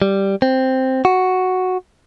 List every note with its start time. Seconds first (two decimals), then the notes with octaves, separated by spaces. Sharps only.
0.02 G3
0.42 C4
1.05 F#4